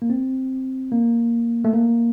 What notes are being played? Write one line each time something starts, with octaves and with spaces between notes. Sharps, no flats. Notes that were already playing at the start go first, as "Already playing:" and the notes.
A#3
C4
A#3
A3
A#3